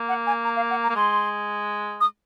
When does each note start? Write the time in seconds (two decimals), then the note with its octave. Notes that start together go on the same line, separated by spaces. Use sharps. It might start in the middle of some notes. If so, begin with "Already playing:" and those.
Already playing: A#3
0.09 F#5
0.27 G#5
0.44 A#5
0.56 F5
0.70 F#5
0.83 A#5
0.89 A#3
0.96 G#3 C6
2.01 D#6